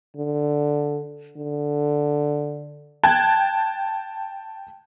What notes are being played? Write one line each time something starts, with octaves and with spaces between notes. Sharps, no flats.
D3
D3
G5 A5 F#6 G#6